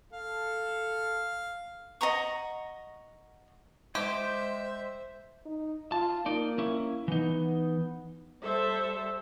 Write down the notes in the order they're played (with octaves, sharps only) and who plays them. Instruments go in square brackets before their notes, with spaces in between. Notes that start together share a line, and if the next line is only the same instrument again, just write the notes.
[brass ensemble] A4 [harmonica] F5
[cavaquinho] D#5 F#5 A#5 C#6
[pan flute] G#3 [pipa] G4 [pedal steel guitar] C5 [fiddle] E5
[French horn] D#4
[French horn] F4 [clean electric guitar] A5
[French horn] A#3 [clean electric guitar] D#4 D5
[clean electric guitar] C#4 E4
[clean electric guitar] E3 D#4 [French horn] B3
[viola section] G3 A4 C5 E5